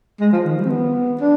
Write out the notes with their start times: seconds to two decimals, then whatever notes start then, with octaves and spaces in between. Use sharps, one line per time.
0.20 G#3
0.33 F3
0.46 D#3
0.58 G3
0.65 C4
0.70 B3
1.21 D4